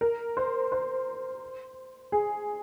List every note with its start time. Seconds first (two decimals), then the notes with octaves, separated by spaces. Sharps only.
0.01 A#4
0.37 C5
0.72 C5
2.12 G#4